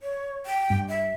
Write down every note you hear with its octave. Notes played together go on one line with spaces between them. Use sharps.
C#5
G5
G2
E5